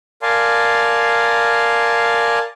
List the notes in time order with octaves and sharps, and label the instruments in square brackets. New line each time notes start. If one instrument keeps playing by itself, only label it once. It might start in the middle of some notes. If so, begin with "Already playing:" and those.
[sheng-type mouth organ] A#4 D5 F5 G#5 A5 C6